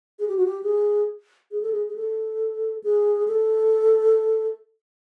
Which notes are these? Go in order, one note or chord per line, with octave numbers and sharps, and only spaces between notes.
G#4
G4
F#4
G4
G#4
G#4
A4
G#4
G#4
A4
G#4
A4